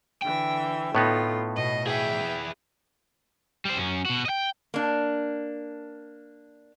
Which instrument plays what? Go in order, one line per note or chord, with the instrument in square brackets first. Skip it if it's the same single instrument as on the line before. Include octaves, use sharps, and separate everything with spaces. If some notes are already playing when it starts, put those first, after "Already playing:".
[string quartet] D3 E3 E5 [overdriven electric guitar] G5
[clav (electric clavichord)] A2 B3 D#4 [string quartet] A3 F4
[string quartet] B2 D#5
[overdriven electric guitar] E4 G#4 [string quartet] E5 G5
[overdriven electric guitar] G3 C5
F#2 C#4
B2 F#4
D#5 G5
[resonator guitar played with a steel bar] A#3 D4